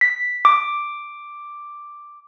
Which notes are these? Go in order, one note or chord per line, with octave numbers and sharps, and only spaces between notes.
B6
D6